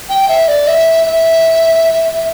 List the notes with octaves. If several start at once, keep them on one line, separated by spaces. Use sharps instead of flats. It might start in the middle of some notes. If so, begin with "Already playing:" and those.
G5
E5
D5
E5
E5